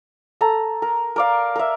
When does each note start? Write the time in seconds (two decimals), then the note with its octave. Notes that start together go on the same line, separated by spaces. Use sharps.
0.41 A4 A#5
0.82 A#4
1.16 A#4 D5 F5
1.56 A#4 E5